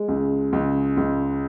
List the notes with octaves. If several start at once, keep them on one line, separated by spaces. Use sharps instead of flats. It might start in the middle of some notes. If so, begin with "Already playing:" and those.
Already playing: G#3
C#2
C#2
C#2